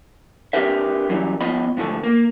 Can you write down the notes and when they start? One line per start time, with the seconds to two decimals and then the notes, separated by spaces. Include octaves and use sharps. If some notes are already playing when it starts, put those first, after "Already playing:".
0.53 C4 D4 G4 A#4 B4 E5
1.09 F#2 E3 F#3 G3
1.41 F3 B3 F4 D#5 B5
1.77 G#2 D3 F3 A3
2.04 A#3